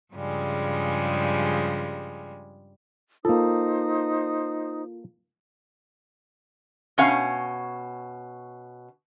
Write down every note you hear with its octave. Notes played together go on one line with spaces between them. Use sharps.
G2 C#3 F3 G3 G#3
A#3 D#4 F4 A4 C5 D#6
B2 C#4 F5